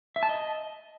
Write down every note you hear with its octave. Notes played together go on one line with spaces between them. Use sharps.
E5
A5
D#5